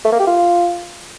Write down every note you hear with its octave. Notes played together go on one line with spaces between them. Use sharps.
A3
A#3
G4
F4